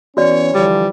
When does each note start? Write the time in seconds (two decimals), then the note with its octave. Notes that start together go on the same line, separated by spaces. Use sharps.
0.17 E3 B3 C#4 F#4 C#5 D5
0.54 D3 E3 F3 G3